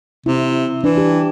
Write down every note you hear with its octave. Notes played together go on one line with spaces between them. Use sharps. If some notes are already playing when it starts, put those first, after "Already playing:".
C3 E4
E3 D4
G4